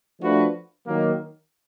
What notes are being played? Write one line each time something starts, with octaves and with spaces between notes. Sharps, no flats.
F3 A3 D4 F#4 B4
D#3 F#3 A#3